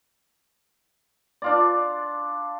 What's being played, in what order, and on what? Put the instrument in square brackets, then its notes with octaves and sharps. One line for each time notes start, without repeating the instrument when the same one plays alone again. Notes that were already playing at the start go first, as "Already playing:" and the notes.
[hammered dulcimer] D4 F4 D5